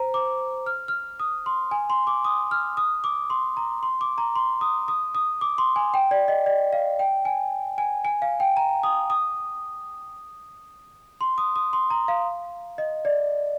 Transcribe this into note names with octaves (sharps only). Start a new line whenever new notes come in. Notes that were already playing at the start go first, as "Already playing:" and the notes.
Already playing: C5 A#5
D6
F6
F6
D#6
C6
G#5
C6
D6
D#6
F6
D#6
D6
C6
A#5
C6
D6
A#5
C6
D#6
D#6
D#6
D6
C6
G#5
G5
D5
D#5
D5
F5
G5
G#5
G#5
G#5
F5
G5
A#5
D#6
D#6
C6
D#6
D#6
C6
A#5
F5
D#5
D5